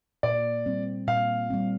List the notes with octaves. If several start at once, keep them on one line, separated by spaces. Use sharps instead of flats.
A#2 D5
G3 C4
A#2 F5
G3 C4